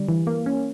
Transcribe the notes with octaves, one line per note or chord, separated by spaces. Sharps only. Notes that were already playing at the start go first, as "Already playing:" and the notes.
Already playing: D3 G3
E3
A#3
C#4